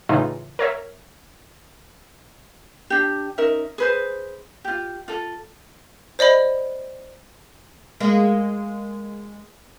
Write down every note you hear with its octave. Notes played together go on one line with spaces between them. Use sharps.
A2 C#3 E3 D#4 F4
A#4 C#5 E5
D4 G4
C#4 D#4 A#4 E5
G#4 B4 C5
F4 G4
F4 A4
C5 D5 D#5 B5
G#3 A#3